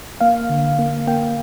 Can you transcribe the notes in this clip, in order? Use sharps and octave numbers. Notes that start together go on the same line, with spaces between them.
A#3 F5
D3
A#3
A#3 G5